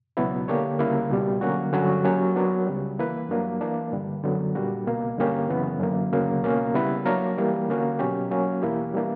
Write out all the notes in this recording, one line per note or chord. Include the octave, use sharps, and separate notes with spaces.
C#2 B2 F#3 B3 E4
D3 A#3 D4 G4 C#5
D2 C#3 G3 A#3 E4
C#2 B2 G3
D3 F#3 A#3 C#4 F#4
G2 D3 F#3 C#4 F#4
F#3 A#3 C#4 G4 C#5
F#3 B3 D4 A#4
C#2 C#3 G3
E3 A#3 E4 B4
G2 F#3 A#3 D4
E3 A#3 D4
G2 D3 G3
F#2 D3 F#3 B3
A#2 G3 A#3 D4 F#4
C#2 B2 A#3
G2 D3 A#3 C#4 G4
F#2 C#3 E3 B3
F#2 D3 A#3
D2 C#3 F#3 A#3
C#2 B2 A#3 C#4
C#3 G3 B3 E4 B4
F#3 A#3 D4 A#4 C#5
E3 G3 A#3
D3 A#3 C#4 F#4
B2 F#3 C#4 G4
F#3 A#3 C#4
E2 B2 A#3 E4 G4
E3 G3 A#3 D4